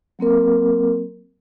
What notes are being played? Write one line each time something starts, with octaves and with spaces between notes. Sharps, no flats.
F#3 A#3 C4 A#4